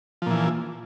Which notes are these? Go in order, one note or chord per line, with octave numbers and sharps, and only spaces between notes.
A#2 E3 F3